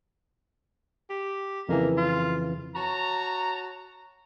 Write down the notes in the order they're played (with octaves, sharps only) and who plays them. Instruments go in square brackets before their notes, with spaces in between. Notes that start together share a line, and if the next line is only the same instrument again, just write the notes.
[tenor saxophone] G4
[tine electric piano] F2 C#3 E3 [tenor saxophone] A#3
[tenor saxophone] F4
[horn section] F#4 C#5 A5 A#5